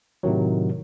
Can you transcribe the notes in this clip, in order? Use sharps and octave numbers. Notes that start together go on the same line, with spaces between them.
A2 C3 D#3 F#3